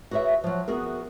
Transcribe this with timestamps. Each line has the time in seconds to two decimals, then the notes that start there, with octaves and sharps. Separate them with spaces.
0.11 F#4 G#4 B4 C#5 E5
0.44 F3 F#3
0.68 B3 F#4 G#4 A#4